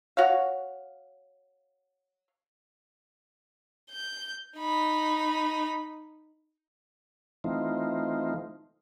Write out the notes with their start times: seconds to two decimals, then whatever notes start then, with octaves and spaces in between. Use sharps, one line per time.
0.17 F#4 C#5 F5
3.91 G6
4.58 D#4 B5
7.44 E3 A3 C4 D#4 F4